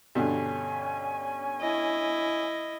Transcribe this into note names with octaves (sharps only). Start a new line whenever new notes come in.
G2 B2 D3 C#4 G#5
E4 D#5